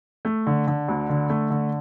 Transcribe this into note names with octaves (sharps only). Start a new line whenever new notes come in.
A3
D3
D3
D2
D3
A3
D3